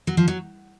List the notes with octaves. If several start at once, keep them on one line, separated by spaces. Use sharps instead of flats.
F#3
F3
F#3